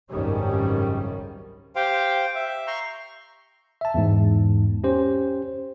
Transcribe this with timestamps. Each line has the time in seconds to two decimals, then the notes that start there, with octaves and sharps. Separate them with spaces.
0.10 G#1 C#2 F#2 D#3 G3 C#4
1.76 G4 C5 F5 G5
2.35 E5
2.67 A#5 C6 C#6 G6
3.81 E5 A5
3.94 E2 G#2
4.84 C#4 G4 C5